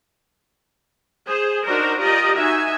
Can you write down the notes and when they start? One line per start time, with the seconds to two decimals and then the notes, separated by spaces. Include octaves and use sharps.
1.26 G#4 C5
1.65 D4 D#4 F#4 A#4 C5
1.99 F4 G4 A#4 D5 D#5
2.34 D#4 F#4 E5 G#5